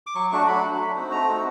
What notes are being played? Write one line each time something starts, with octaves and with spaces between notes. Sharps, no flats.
D6
F#3 C#6
A3 D4 F#4 C#6
F#3 B5
A3 D4 F#4
A3
C4 D#4 F#4
A3 A#5
C4 D#4 F#4